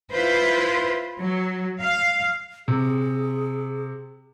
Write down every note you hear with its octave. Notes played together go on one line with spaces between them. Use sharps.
E4 F4 B4 C5
F#3
F5
C3 G#4